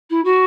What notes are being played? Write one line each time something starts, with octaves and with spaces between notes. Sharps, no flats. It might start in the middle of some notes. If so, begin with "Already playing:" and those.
E4
F#4